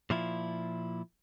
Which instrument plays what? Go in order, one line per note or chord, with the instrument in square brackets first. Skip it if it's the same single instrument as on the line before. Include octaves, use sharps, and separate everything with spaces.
[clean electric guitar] A#2 F3 E4